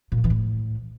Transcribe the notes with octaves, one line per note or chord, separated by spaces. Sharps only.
A#2
F3
E3
A2